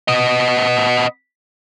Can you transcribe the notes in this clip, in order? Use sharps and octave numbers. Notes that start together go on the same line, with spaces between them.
B3 D#5